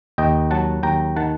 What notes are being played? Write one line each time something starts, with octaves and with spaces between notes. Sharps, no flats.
D#2 D#5 G5
F#3 F#5 A5
D#2 G5 A#5
D#3 F#5 A5